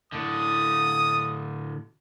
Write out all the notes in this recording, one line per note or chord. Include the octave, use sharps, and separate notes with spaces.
A2 D3 D#6